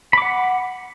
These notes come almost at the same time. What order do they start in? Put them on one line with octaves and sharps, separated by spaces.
B5 D6 F#5